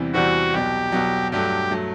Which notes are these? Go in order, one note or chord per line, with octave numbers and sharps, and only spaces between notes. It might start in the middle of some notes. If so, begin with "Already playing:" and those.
Already playing: E2 C3 E3 G3 C4
E2 C3 E3 G3 C4 F#4
C2 B2 F#3 G4
C2 B2 F#3
G2 F#3 A3 G4
F#3 A3